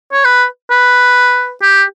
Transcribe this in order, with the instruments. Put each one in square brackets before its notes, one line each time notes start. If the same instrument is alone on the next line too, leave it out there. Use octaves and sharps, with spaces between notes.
[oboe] C#5
B4
B4
G4